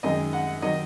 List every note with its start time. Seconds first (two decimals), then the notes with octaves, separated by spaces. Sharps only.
0.03 F#2 D#3 G#3 D#5
0.33 F#5
0.62 D#3 F#3 D#5